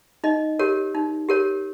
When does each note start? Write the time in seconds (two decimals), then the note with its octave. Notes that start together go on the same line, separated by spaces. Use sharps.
0.24 D#4 D#5
0.59 G4 A#4 C#5
0.95 D#4
1.29 G4 A#4 C#5